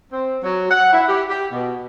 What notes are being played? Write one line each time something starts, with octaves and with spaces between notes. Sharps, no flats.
C4
F#3
F#5
E4
G4
G4
B2